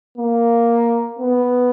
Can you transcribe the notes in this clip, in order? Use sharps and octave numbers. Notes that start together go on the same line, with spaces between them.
A#3
B3